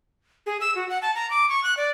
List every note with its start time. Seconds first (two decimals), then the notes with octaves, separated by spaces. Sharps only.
0.46 G#4
0.61 E6
0.75 F#4
0.90 F#5
1.02 A5
1.15 A#5
1.31 D6
1.49 C#6
1.64 F#6
1.77 D5